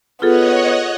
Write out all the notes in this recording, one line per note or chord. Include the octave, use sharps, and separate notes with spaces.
B3 F4 G#4 A4 C#5 D#5 F#5